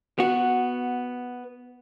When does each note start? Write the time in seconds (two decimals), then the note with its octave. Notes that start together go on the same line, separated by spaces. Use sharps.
0.19 B3 F#4